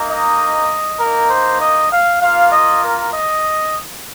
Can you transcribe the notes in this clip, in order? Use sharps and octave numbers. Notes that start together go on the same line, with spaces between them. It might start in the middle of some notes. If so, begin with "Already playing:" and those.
Already playing: A#3 D#4
D#5
A#3 D#4 A#4
C5
D#5
F5
A#3 F4 F5
D#5
A#4
D#5